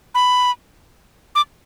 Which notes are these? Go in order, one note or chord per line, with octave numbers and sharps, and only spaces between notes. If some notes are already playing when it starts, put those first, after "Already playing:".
B5
D6